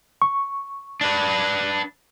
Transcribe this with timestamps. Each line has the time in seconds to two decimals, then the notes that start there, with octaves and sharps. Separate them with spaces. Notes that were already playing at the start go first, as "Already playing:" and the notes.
0.22 C#6
1.01 D4 B4